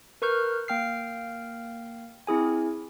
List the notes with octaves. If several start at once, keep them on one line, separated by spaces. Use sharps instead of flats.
A#4 B4 C#6 F6 G6
A#3 G5 F6 C7
C4 E4 G#4 G#5